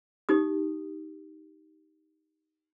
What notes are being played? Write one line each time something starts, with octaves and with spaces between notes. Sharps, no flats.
D#4 G4 D#6